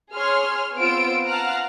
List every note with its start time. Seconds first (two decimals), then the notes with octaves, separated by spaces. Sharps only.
0.14 G#4 C#5 C6 F6
0.77 B3 C4 F4 C5 E6 D7
1.29 F5 F#5 A5 A#5 F6 F#6